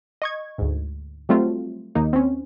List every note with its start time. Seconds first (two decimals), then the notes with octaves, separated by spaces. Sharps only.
0.22 D#5 C#6 G#6
0.58 D2 G#2
1.29 F#3 G3 A3 C4 F4
1.95 D#2 A#3 D#4
2.13 C4 C#4